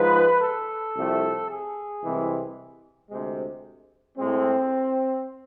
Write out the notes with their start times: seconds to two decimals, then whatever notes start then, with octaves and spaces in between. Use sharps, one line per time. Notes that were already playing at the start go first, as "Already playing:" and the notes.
Already playing: G#2 F3 G#3 B4
0.41 A4
0.95 C2 C3 F3 A3
1.49 G#4
2.03 C2 C3 E3 G#3
3.10 D2 C3 G#3
4.17 A2 G#3 C4